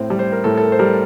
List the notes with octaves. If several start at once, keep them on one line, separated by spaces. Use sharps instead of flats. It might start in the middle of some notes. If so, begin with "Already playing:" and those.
Already playing: A2 C4
G3
C5
A#4
A2 A4
A4
A#4
C5
G3 A#4